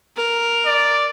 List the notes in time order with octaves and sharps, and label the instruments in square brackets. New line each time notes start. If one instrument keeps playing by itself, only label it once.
[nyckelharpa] A#4
[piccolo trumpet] D5